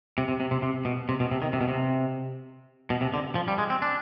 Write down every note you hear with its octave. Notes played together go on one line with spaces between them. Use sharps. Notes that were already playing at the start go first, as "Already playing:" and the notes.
C3
C3
C3
C3
C3
B2
C3
B2
C3
D#3
C3
B2
C3
B2
C3
D3
F3
G3
G#3
C4
D4